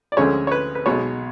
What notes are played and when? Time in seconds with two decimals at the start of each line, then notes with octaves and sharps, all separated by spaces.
0.12 D5
0.17 D2 D3 F3 G#3 C#4 C#5
0.47 C#5
0.52 B4
0.75 B4
0.86 B1 B2 G#3 C#5